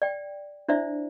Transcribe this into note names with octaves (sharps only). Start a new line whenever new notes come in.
D5 G5
D4 E4 C5 D5 E5